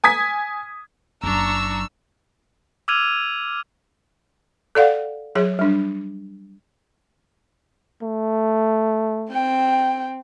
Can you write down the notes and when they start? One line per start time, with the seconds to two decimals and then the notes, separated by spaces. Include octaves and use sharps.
0.04 G#5 D#6 G#6 B6
1.23 F#1 F#3 D4 A#5 C#6 E6
2.88 D6 E6 F6 G#6 D#7 F7
4.75 A4 D5 F5 F#5
5.35 F#3 G#4 C#5
5.59 G3 D4
8.03 A3
9.32 C4 G5